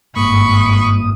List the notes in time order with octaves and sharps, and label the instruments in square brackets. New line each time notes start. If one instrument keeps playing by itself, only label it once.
[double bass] G#1 [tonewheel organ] G2 A#3 D#6 [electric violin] B5 [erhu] C#6